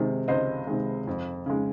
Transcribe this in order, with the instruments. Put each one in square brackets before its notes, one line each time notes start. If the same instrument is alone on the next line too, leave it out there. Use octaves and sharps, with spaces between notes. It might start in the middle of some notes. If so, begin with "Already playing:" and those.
Already playing: [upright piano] C3 D#3 G#3
C#2 C5 D#5
C3 D#3 G#3
F2
C#3 G#3